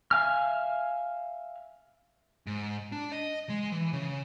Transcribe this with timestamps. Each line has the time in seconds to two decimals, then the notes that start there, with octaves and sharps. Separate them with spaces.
0.11 E5 F5 G#5 F6
2.47 G#2
2.92 D4
3.12 D#5
3.49 G#3
3.72 E3
3.93 C#3